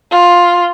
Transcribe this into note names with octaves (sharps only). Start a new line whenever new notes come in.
F4